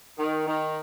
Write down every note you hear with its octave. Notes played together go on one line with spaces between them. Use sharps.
D#3
D#3